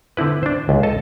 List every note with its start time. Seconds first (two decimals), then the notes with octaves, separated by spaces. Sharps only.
0.17 D3 C4 E4 B4
0.43 D4 C5
0.69 C#2
0.83 A4 D#5 A5